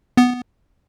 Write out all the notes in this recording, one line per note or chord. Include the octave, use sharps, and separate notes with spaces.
B3